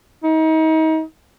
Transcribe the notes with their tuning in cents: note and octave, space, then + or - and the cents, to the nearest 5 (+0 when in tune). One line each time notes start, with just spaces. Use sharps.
D#4 +35